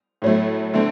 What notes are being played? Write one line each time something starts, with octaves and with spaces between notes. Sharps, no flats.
A2 F#3 A3
D3 A3 C4